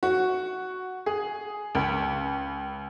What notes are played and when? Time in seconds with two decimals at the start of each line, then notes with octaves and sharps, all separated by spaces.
0.03 F#4
1.06 G#4
1.75 C#2